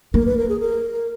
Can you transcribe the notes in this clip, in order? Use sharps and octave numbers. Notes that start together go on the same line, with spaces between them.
A#3 A#4
B4
A#4
G#4
A#4